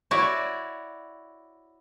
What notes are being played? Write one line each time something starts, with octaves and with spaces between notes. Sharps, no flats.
E4 F#4 C#5 D5